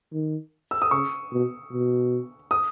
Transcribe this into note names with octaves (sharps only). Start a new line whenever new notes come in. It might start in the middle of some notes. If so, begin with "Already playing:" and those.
D#3
E6
D#6
C#3 C#6
B2
B2
D#6